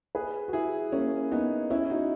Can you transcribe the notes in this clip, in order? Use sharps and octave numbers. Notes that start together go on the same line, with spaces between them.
G#4 B4
F#4
E4 G#4
A#3 C#4
B3 D#4
C#4 E4
D#4 F#4